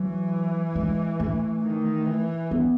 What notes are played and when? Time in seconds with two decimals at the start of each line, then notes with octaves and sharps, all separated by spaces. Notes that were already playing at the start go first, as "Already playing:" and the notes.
Already playing: E3 F#3
0.75 G#3
1.20 A3
1.63 D#3
2.06 E3
2.51 B3